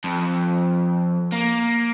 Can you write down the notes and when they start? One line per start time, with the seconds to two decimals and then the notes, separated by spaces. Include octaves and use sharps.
0.04 F2
1.32 A#3